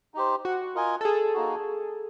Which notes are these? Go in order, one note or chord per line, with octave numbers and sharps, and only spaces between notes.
D#4 G4 C5
F#4
F4 A#4 D#5 G#5
A4
G#4
A#3 D#4 F#4